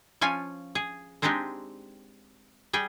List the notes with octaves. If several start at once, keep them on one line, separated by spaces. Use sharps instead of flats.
F3 C#4 F4 G#5
G#4
G#3 C4 D4 D#4 G4 G#4
G3 G#4 G5